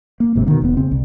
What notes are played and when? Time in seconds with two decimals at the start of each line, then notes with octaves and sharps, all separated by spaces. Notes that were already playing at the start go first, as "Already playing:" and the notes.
0.20 A#3
0.35 G1 G#2 C3
0.47 B2 D3 D#3 A#3
0.62 F1 B3
0.77 C#3 C4
0.91 C2